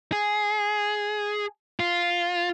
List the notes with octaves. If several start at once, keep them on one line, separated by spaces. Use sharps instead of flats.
G#4
F4